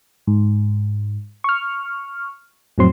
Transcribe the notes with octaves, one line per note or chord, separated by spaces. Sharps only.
G#2
C#6 F6
F2 A2 F#3 C4 C6